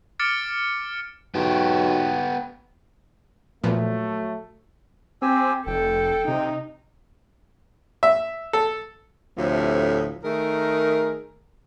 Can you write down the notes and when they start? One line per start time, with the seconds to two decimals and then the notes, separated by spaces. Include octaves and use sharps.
0.19 D6 F6 A6 C#7 D7
1.35 B1 B3 G4
3.64 A#2 F3 F#3 A3 B3
5.22 C4 G4 G#5 E6
5.67 F1 A4 G5
6.28 C3 D#4
8.03 E5
8.53 A4
9.38 D2 A2 C3 F3
10.24 D#3 A3 G#4 A#4